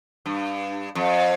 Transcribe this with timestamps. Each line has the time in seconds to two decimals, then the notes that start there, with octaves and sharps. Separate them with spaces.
0.26 G2
0.95 F2